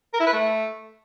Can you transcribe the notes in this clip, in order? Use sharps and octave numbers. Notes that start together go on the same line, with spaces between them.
A#4
E4
B4
A3